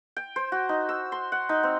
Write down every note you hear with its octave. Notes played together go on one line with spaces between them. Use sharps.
G5
C5
F#4
D#4
E6
C6
F#5
D#4
C4